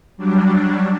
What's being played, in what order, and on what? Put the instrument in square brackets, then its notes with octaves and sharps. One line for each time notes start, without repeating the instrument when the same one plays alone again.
[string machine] F#3 G3 D4